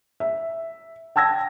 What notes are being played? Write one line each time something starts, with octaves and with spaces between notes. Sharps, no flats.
E5
G5 A5 E6 G#6 A#6